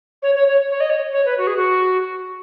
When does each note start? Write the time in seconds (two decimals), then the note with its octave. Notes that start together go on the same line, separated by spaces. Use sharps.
0.22 C#5
0.35 C#5
0.48 C#5
0.70 C#5
0.80 D#5
0.89 C#5
1.12 C#5
1.25 B4
1.37 F#4
1.47 G#4
1.56 F#4